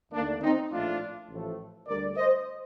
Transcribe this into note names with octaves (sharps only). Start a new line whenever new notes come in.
D#2 D3 A3 A#3 D4
C4 D#4
A#1 A2 F3 A3 D4 F4
A1 A2 F3 A3
D2 D3 G3 A#4 D5
C5 D#5